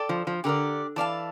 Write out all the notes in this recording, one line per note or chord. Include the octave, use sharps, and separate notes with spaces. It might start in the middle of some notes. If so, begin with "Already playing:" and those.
Already playing: A4 D5 G5
F3
F3
D3 G4 A#4 D5
E3 A4 D5 F5 A5